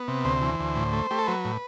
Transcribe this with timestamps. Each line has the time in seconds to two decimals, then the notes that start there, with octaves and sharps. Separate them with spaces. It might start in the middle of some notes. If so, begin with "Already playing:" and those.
Already playing: B3
0.08 C3
0.25 D2 C5
0.41 E3
0.60 D2
0.76 A2
0.93 A3
1.11 A3 G4
1.19 A4
1.27 F#3 B4
1.45 A2